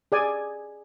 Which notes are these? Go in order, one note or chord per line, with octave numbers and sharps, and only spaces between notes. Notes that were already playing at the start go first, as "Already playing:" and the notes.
G#4 D5 G#5